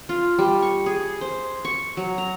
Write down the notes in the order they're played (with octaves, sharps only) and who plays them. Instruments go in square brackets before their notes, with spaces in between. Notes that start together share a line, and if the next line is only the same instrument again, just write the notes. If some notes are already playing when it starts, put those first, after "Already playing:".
[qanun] F4
G3
C#6
G#4
C5
C#6
F#3
A#5